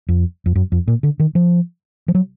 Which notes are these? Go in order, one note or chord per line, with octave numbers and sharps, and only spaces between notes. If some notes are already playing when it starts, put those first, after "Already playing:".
F2
F2
F#2
F2
A#2
D3
D#3
F3
F3
F#3